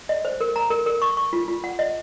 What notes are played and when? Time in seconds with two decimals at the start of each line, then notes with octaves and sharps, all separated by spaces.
0.09 D#5
0.25 C5
0.41 A#4
0.56 A#5
0.70 A#4
0.86 A#4
1.02 C#6
1.17 C#6
1.33 F4
1.48 F4
1.64 F#5
1.79 D#5